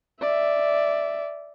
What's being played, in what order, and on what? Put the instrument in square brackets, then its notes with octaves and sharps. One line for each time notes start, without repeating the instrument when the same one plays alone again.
[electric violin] D5 [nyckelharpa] E5